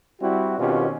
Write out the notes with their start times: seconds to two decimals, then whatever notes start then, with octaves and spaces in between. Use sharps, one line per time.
0.20 G3 C4 E4 F#4
0.58 B2 D#3 C4 C#4 F4 G4